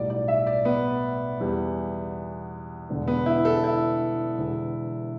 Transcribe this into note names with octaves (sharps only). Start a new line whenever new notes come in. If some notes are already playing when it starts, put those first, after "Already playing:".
Already playing: B1 A2 G3 D5
D5
E5
D5
B3
E2 E3 G3
E1 E2 D3
B3
E4
A4
E4
E1 E2 D3